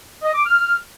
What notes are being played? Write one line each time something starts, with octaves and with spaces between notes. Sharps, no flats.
D#5
D6
F6